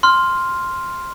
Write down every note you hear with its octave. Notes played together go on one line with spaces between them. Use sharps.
C6 F6